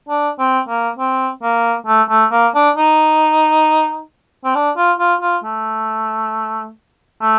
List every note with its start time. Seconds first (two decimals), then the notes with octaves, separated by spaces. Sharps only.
0.09 D4
0.39 C4
0.68 A#3
0.98 C4
1.43 A#3
1.87 A3
2.10 A3
2.32 A#3
2.55 D4
2.77 D#4
4.44 C4
4.55 D4
4.77 F4
4.99 F4
5.21 F4
5.44 A3
7.22 A3